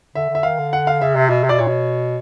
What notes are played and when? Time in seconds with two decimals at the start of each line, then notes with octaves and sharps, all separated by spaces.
0.15 D3 E5
0.29 D3
0.35 E5
0.43 D#3 F5
0.58 D3
0.73 F#5
0.87 F5
1.01 C#3 E5
1.15 C3
1.29 B2
1.44 C3
1.49 B2 D5
1.59 A#2 C#5
1.68 B2